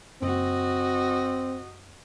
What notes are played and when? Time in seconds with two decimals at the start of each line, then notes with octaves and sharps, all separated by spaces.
0.22 F#1 C4 F#4 D#5